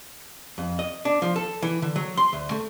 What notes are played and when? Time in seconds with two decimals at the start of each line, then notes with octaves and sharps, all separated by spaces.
0.58 F2
0.79 D#5
1.05 D4
1.22 F3
1.36 A4
1.63 E3
1.82 D3
1.96 F#3
2.17 C6
2.33 D2
2.51 A3